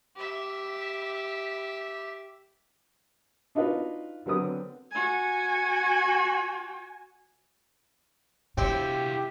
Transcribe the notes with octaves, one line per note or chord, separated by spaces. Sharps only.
G4 E5
D4 D#4 F4 F#4 B4
D3 F#3 B3 C4 A#4 D#6
F#4 G#5
C3 C4 E4 F#4 G4